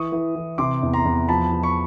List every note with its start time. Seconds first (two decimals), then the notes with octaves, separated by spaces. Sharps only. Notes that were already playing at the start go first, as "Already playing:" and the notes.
Already playing: E3 C#6 D#6
0.12 E3
0.35 E3
0.58 C3 C6 D6
0.83 E2
0.93 A#5 C6
1.06 E2
1.28 F3 A5 B5
1.52 F3
1.63 B5 C#6